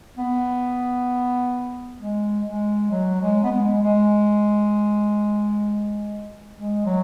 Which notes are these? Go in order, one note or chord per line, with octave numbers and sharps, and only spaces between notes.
B3
G#3
G#3
F#3
G#3
B3
G#3
G#3
G#3
F#3